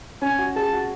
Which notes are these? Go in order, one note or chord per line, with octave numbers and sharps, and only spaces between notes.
C#4 G#5
F#4
G#4 A5
F#4